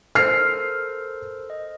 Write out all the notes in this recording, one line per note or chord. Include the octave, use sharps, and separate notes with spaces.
A4 A#4 C5 F6 C7
D#5